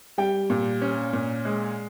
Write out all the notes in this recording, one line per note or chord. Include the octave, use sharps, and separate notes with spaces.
G3 G5
A#2
C#4
A#2
G#3